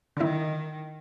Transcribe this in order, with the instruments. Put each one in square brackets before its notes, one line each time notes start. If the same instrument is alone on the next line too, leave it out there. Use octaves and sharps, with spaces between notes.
[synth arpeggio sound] D3 E4 [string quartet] D#3